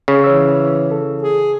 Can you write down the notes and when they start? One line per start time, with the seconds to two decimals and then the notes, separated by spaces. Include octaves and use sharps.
0.08 C#3
0.24 E3 C#5 E6
0.91 A4
1.23 G#4